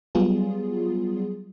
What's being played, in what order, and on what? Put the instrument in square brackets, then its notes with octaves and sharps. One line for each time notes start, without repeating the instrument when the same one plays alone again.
[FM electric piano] F#3 G3 B3 F4 G#4